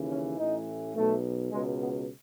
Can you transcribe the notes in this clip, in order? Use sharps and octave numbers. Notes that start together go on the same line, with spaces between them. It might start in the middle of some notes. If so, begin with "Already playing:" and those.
Already playing: D#2 C#3 E3
C#4
A1 A2 E3 D#4
B1 B2 A3
C#2 B2 G#3
B3